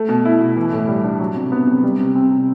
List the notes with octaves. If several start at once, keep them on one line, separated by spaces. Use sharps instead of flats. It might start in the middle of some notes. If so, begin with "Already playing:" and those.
Already playing: A3
B2
E4
B2
E3
A2
G3
D4
F#3
C3
B3
C3
G3
C3
C4
C3